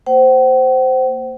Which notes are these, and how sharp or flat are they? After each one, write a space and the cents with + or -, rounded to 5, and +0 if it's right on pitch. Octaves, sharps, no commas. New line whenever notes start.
A#3 -5 C5 -5 F#5 +45